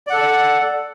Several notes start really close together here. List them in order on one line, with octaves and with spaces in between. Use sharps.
D5 F#5 A4